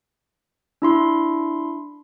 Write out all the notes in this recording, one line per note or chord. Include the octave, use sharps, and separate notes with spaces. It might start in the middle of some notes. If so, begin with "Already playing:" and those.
D4 E4 C6